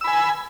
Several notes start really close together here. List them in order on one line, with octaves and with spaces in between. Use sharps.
E6 B5 G#5